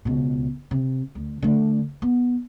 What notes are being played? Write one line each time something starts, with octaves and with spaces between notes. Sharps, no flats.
C#2 B2
C3
D2
D3 A3
B3